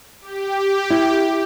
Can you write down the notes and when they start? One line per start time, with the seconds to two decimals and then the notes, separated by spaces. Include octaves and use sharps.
0.21 G4
0.90 E4